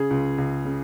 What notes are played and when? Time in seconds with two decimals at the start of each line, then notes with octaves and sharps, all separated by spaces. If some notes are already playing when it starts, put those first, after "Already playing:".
Already playing: C#3 G#4
0.10 C#2
0.38 C#2
0.65 C#3